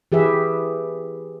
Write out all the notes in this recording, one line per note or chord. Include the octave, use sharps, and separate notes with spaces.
E3 G4 G#4 B4 E5